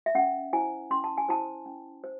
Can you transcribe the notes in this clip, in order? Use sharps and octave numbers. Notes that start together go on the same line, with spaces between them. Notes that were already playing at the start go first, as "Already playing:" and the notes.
E5
C#4 F#5
E4 C5 G#5
C#4 C6
A5
G#5
E4 C5 A5
C#4
C5